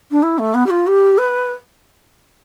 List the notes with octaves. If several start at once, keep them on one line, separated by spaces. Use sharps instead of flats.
D4
E4
A3
B3
G4
F4
G4
B4